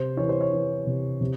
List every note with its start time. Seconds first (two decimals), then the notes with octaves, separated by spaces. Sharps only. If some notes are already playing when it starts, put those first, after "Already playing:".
Already playing: C3 C5
0.17 E3 C#5
0.29 C5
0.41 C#5
0.52 E3
0.87 C3
1.21 C3